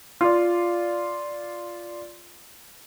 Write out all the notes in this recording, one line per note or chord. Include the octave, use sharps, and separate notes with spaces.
F4 D5